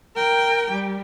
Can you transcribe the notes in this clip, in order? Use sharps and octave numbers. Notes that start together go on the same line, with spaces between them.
A#4 G5
G3